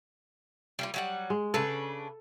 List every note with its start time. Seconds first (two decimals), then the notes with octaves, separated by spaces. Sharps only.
0.79 G3 A#3 F4
0.94 F#3 G3 F#5
1.30 G#3
1.54 C#3 D4 A4 B4